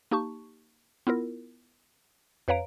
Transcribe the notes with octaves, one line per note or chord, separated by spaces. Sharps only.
A#3 D#4 G4 A5 C#6
B3 E4 F4 A#4
F2 B4 C#5 F5 A#5 D7